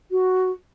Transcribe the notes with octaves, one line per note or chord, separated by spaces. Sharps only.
F#4